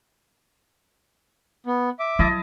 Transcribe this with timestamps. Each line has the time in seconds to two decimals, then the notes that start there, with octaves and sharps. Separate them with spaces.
1.67 B3
1.99 E5 D6
2.19 F#3 E4 D#5 A5